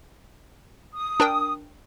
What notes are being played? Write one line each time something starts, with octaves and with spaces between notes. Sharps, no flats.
D#6
D4 A#4 G5